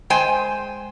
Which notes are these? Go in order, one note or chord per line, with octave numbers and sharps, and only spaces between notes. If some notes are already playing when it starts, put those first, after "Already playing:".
G#3 C5 G5 G#5